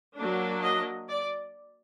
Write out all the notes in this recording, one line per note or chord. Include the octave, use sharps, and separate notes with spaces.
F#3 A#3 D4
D#5
D5